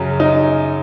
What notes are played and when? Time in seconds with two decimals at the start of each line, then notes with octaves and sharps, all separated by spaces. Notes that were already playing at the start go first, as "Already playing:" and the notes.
Already playing: F#2 C#3 F#3 C#4
0.20 D#4